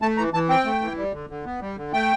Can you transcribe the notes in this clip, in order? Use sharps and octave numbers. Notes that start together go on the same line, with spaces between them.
A3 A5
E3 A#5
E3 A5
C4 G5
A3
E3
G3
D3
D3
B3
G3
D3
A3 G5